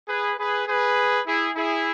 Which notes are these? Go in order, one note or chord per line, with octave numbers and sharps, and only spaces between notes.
G#4 B4
G#4 B4
G#4 B4
E4 G#4
E4 G#4